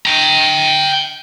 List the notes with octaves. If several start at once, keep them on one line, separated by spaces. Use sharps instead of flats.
G5 A#5